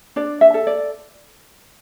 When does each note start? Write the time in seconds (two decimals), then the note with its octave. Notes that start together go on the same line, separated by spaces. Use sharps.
0.16 D4 D5
0.41 E5
0.54 A4
0.67 D5